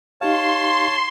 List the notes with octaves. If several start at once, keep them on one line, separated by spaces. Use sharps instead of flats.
D#4 G4 C#5 F5 A5 C6